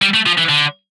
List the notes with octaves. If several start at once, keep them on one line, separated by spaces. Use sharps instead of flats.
G3
A3
F3
E3
D3